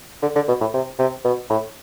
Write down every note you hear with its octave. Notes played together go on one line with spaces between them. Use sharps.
D3
D3
B2
A2
C3
C3
B2
A2